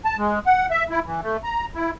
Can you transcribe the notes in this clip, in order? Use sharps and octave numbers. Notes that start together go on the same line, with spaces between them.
A5
G#3
F#5
E5
E4
E3
A3
A#5
E4